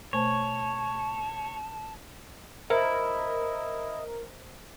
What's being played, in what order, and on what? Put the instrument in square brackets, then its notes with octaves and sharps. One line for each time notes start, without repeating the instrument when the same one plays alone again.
[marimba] B2 A3 C5 [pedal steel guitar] C#5 [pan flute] A5
[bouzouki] E4 [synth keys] A#4 [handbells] C5 [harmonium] D#5 E5